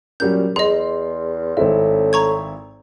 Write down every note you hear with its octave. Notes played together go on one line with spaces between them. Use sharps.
A#2 F#3 G3 C#4 G6
E2 G#4 D#5 C6
G#1 A2 C4 E4 D#5
A#5 C#6 G#6